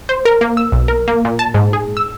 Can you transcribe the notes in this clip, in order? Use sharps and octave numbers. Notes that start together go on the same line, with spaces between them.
C5
A#4
A#3
E6
B1
A#4
A#3
A#2
A5
G#2
G#4
E6